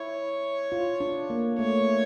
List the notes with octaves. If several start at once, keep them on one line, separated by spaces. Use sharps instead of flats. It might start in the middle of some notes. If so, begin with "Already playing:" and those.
Already playing: E4 C#5
F4
D4
A#3
A3 C#5